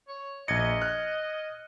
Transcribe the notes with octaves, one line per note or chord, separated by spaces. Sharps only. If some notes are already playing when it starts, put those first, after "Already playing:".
C#5
A#1 D#5 G#6 C#7
F6 F#6